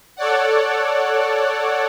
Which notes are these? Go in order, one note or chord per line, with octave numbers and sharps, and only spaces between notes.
A4 C#5 D5 F#5